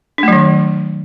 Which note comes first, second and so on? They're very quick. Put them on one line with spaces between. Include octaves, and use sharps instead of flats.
D4 A3 F#3 D#3